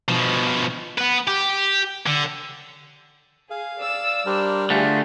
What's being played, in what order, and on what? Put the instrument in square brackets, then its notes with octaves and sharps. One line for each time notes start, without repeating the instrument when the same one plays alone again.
[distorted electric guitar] B2 F3
B3 B4
G4
D3
[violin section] G#4 [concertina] F5
[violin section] D5 E6
[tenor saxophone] G3 [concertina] D4 A#4 C5
[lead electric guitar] D3 A3 [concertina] F4 [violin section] G4 G#4